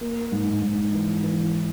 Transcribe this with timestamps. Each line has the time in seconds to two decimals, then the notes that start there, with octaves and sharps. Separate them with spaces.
0.01 A#3
0.32 G#2
0.62 G#2
0.93 E3
1.23 E3